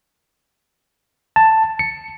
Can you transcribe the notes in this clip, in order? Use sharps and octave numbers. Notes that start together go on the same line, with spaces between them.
A5
C#7